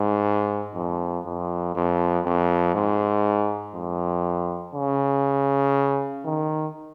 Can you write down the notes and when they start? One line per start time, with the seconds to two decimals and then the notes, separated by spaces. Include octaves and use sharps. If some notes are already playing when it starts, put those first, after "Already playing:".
Already playing: G#2
0.75 F2
1.25 F2
1.75 F2
2.25 F2
2.75 G#2
3.75 F2
4.75 C#3
6.25 D#3